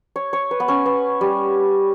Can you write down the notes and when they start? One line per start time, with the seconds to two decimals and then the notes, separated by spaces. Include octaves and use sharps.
0.16 C#5
0.33 C#5
0.51 B4
0.60 B3
0.68 C#4
0.86 B3
1.21 G3